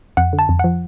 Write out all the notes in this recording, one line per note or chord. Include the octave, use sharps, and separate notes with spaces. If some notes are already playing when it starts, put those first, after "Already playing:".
F2 F#5
D3
A5
F2
F#5
F3